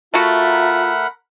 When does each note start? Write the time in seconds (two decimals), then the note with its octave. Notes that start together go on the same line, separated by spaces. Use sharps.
0.14 A3 F4 F#4 A#4 E5 F#5 A#5 B5